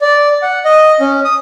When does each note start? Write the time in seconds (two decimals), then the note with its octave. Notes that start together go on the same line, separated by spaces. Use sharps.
0.01 D5
0.42 F#5
0.65 D#5
1.00 C#4
1.25 D#6